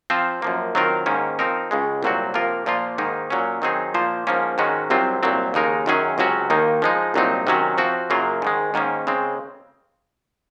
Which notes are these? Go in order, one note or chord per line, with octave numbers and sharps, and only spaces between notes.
F3 C4 F4 C5
F#2 F3 A#3
D#3 F#3 C4 F4 A#4
G#2 D#3 A#3 C#4
F3 C4 D#4 A#4
C#2 C#3 G#3
C2 A#2 F#3 C4 F#4
C3 F3 A#3 F4 A#4
A#2 F3 A#3 F4
G#2 D#3 A#3 D#4
A#2 F#3 C#4
D#3 F#3 C4 D#4 G#4
A#2 F3 A#3 F4 C5
G#2 F3 A#3 C#4
G#2 D#3 G#3 C#4 F#4
C2 C3 F#3 C4 F4
C2 A#2 F#3 C4
D#2 C#3 G#3 D#4 A#4
F#2 D#3 F#3 C#4 G#4
C#2 C3 F#3 C#4 F#4
D#2 D#3 A#3 D#4
F3 G#3 D#4
C2 A#2 F#3 C4 D#4
C3 D#3 F#3 C#4 F#4
F3 C4 F#4
F#2 C#3 F#3 A#3 F4
G#2 D#3 G#3
G#2 D#3 A#3 C#4
C#3 G#3 C4